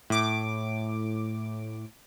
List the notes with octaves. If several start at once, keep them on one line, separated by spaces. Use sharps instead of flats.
A2 D6